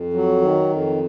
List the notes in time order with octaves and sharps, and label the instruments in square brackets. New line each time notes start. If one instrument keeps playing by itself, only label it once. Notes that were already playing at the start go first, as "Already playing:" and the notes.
Already playing: [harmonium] F2
F#3
D#3
F2